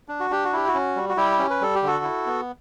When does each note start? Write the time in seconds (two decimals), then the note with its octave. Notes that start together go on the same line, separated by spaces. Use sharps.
0.08 D4
0.20 F#4
0.30 D4 G4
0.44 F#4
0.53 E4 G4
0.68 F#4
0.74 C#4
0.96 G3
1.09 F#4
1.17 G3 E4 G4
1.39 C#4
1.50 B4
1.61 G3 A4
1.76 G4
1.83 D3 F#4 A4
2.04 E4
2.26 B3